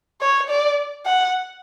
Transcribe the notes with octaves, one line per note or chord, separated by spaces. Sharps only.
C#5
D5
F#5